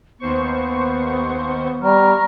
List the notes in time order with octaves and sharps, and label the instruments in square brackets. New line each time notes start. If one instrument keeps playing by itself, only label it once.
[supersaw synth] D#2 C5 C#6 [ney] B3
[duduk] G3 [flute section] A#5 C#6 F6